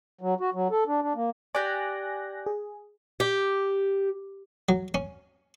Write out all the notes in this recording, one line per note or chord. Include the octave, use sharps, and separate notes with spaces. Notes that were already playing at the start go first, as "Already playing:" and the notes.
F#3
F#4
F#3
A4
D4
D4
A#3
G4 D5 G#5 F#6 A#6
G#4
G4
F#3
C#4